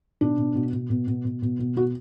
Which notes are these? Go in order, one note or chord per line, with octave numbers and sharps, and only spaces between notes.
B2 D4
B2
B2
B2
B2
B2
B2
B2
B2
B2 F#4